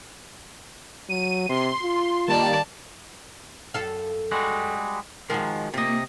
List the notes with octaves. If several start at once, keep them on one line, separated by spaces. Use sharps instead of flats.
F#3 D#7
C3 C6
F4
D#3 G3 A#3 D5 A5
F#2 A4 F5
G3 G#3 F#4
D#3 F3 G#3 F#4 A#4
C3 A#3 F4 D#5